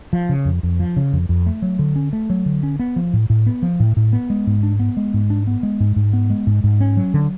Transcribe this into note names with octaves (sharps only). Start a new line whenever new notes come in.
F3
C#3
F2
F2
F3
C#3
F2
F2
A3
F#3
D3
C#4
A3
F#3
D3
C#4
B3
F3
A2
A2
B3
F3
A2
A2
B3
G#3
G#2
D4
B3
G#3
G#2
D4
B3
G#3
G#2
G#2
B3
G#3
G#2
G#2
C#4
F#3
D3